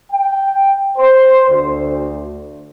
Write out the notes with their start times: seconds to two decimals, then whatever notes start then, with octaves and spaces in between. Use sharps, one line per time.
0.13 G5
0.98 C5
1.50 D2